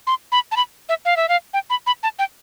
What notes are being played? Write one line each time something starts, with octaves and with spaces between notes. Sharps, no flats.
C6
B5
A5
B5
E5
F5
E5
F5
G5
B5
B5
A5
G5